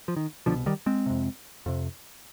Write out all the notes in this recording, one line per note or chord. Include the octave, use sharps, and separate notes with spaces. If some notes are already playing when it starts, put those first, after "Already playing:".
F3
D#3
C2 B2 D3 F3
D#3 G3
G#3 C4
F2 C3
F2 C3